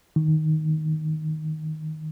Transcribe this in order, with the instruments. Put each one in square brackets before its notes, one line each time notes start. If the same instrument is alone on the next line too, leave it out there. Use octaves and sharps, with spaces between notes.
[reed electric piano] D#3